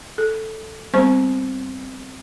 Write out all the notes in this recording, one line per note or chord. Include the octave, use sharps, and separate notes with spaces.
A4
G3 B3 C4 C5 C#6